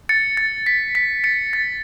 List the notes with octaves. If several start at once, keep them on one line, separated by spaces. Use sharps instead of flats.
A6 C#7
A6
B6
B6
A6 C#7
A6